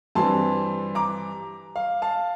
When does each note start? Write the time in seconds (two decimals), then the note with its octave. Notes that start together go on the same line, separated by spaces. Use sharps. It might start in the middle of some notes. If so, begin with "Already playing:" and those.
0.15 G2 E3 G3 C4 A5 C6
0.95 A#5 D6
1.76 F5
2.02 F5 A5